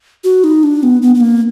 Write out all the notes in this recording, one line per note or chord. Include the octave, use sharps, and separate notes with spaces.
F#4
D#4
D4
B3
B3
B3
A#3